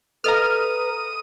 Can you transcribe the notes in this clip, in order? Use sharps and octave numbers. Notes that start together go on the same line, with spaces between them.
A4 B4 D#5 F5 A#5 D#6 F6